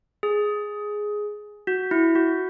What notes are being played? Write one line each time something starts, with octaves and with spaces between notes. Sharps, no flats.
G#4
F#4
E4
F#4